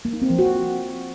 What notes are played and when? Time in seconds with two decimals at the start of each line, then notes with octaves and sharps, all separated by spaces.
0.05 A#3
0.13 D#4
0.22 C4
0.30 F3
0.39 F#4